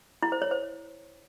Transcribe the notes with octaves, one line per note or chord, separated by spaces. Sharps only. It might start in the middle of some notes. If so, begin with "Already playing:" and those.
E4
C5
C#5
C5